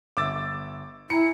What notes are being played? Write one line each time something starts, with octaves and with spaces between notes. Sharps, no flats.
G1 E5 D6 E6 A6
E4 G#5 A#5 B5 C#7